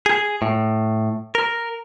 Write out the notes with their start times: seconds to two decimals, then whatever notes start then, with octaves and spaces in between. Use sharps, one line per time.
0.06 G#4
0.42 A2
1.35 A#4